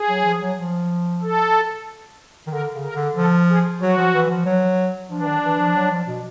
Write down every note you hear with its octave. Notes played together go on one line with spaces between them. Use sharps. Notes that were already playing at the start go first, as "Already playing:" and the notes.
Already playing: G#4
F#3
F3
F#3
F3
A4
D#3
D3 A#4
C#3
A#4
D3
F3 A4
G#4
F#3 F#4
F3
E3
F3
F#3
F3 D4
E3
D#3
E3
F3
F#3
F3
B2